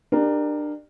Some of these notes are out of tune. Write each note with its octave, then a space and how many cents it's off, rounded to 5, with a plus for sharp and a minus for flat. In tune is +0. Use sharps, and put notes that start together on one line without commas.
D4 +30 G4 +15 A#4 +0